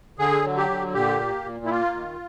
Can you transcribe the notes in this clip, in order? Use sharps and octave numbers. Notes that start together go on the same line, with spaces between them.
D3 G#4
F#3
G4
D3
A#2 G4
A#3
A#2
E4
A#3 F4
D#3